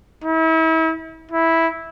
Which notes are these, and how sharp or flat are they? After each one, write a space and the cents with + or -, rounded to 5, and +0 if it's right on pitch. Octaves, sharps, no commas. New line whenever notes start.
E4 -35
E4 -5